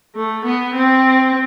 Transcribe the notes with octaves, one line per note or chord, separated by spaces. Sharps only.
A3
B3
C4